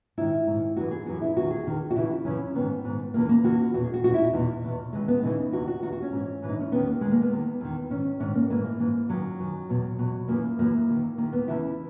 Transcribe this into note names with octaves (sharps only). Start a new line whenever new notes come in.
G#2 D#3 E4
G#2 D#3
F#2 E3 F#4
G#4
F#2 E3 F#4
E4
E2 D#3 F#4
G#4
E2 D#3
F#4
F#2 C#3 E3 E4
F#2 C#3 E3 C#4
G#2 D#3 B3
G#2 D#3
E2 C#3 E3 A#3
A#3
E2 C#3 E3 F#4
E2 B2 F#4
G#4
F#4
E2 B2 F#4
E4
D#4
E2 B2
E2 B2
D#2 C#3 E3 G#3
B3
D#2 C#3 E3 D#4
E2 D#3 F#4
F#4
E2 D#3 F#4
F#4
C#4
G#2 E3
G#2 E3
D#4
C#4
D#2 D#3 B3
A#3
D#2 D#3 G#3
A#3
B3
E2 D#3
E2 D#3
G#2 D#3 C#4
G#2 D#3 C#4
A#3
G#2 E3 A#3
A#3
G#2 E3
F#2 D#3 F#3
F#2 D#3
E2 B2
E2 B2
F#2 E3 A#3
F#2 E3 A#3
D#2 D#3
D#2 D#3 A#3
B3
E2 C#3 E3 E4